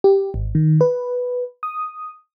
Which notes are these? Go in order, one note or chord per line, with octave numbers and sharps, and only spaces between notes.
G4
G#1
D#3
B4
D#6